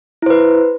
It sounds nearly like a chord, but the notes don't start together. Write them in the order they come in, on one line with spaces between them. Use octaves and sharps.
E4 C5 B4